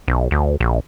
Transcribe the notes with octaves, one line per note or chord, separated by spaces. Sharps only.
B1
D2
A#1